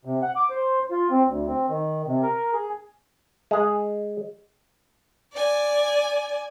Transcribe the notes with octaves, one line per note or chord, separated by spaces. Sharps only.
C3
F#5
D6
C5
F4
C4
D2
C4
D#3
C3
A#4
G#4
G#3 G#4
D5 G#5